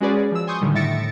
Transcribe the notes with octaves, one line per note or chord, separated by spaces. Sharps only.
G#3 C#4 F#4 G#4 B4 D5
F3 E6
G#5 C6 C#6 D#6 G6
A2 D3 D#3 G3
A2 E5 A6 A#6 C#7 D7